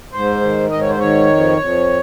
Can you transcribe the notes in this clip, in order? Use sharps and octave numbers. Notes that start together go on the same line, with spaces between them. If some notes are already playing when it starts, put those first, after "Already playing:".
G#2 C5
D#3
G#2 D#5
C#5
C5
D#3 C#5
F2
F2